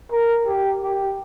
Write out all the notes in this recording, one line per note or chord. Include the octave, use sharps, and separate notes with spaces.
A#4
G4
G4